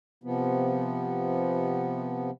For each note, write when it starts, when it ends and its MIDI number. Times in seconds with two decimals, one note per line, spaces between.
0.24 2.31 48
0.24 2.31 53
0.24 2.31 59